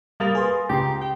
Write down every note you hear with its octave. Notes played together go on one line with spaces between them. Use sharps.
G3 A#3 D#6 A6 F7
G#4 B4 G#5 C6
C#2 G4 G5 A#5 C6
G5